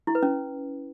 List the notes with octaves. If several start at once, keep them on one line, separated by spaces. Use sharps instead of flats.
E4
B4
C#4